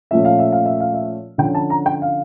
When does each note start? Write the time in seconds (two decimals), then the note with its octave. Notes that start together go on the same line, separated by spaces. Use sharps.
0.11 A#2 F3 A3 C#4 E5
0.25 F5
0.39 E5
0.52 F5
0.66 E5
0.80 F5
0.94 E5
1.38 D3 F3 C#4 G5
1.55 A5
1.70 A#5
1.86 G5
2.02 F5